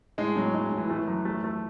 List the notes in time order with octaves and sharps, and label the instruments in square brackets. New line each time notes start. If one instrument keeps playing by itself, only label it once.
[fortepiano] A2 [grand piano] G#3
[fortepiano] A2 [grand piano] F#3
[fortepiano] A2 [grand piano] G#3
[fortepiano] A2
[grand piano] E3
[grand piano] E3 [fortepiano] A3
[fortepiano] F#2
A3
A3